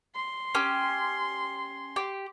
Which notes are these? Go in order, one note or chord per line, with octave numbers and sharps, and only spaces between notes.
C6
C#4 G4
G4